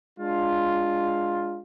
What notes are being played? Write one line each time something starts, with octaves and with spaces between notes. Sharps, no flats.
G#3 D4 F4